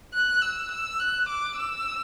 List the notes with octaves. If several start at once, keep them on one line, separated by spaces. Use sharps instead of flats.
F#6
E6
E6
F#6
D6
E6